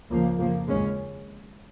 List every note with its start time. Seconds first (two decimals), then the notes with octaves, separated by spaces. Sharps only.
0.10 C#2 C#3 F3 A#3
0.39 F2 C#3 F3 A#3
0.68 D#2 C#3 G#3 C#4